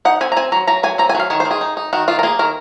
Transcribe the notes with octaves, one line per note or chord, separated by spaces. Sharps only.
D#4 F#5
C4 G#5
A#5
C4 G#5
F#3 A#5
F#3 A#5
F#3 G#5
C4 A#5
G#5
F#3
F5
D#3 C#5
C5
D#3
G#4
D#4
D#4
D#3 F#4
D#3 F4
A#4
A#3 G#4
D#3 A#4